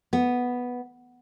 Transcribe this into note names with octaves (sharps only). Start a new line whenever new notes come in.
B3